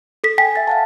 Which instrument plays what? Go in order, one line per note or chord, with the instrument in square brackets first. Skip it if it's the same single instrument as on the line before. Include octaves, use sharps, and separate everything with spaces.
[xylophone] A4 B6
[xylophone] G5 B6 [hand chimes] G#5
[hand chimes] E5 A6
F5 F#5 A5